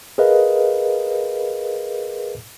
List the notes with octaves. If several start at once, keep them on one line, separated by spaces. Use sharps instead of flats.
G#4 A#4 B4 D#5 F5